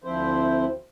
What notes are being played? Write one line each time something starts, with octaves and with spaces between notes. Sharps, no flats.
D2 F3 C4 E4 C5